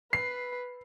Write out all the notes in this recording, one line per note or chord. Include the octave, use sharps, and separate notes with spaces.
B4 C7